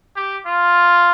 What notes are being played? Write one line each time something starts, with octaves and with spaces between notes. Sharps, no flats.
G4
F4